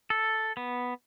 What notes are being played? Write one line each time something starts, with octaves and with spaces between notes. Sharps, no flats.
A4
B3